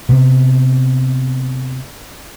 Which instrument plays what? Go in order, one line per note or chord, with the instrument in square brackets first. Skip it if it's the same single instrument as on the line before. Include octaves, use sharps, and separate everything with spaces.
[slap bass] C3 B3